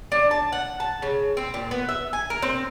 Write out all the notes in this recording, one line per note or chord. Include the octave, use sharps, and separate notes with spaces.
D4
A5
F#5
A5
C#3
C4
A#2
B3
E5
G#5
A#4
C4